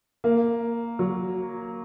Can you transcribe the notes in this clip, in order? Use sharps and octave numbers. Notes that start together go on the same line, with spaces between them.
A#3
F#3